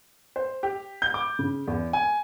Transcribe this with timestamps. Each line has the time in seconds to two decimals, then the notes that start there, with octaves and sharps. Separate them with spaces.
0.36 C5
0.63 G4
1.02 G6
1.14 D6
1.39 C#3
1.67 E2
1.93 G#5